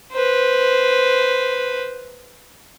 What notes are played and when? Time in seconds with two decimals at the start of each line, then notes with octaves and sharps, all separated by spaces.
0.13 B4 C5